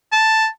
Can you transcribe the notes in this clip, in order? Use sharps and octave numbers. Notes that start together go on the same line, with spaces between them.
A5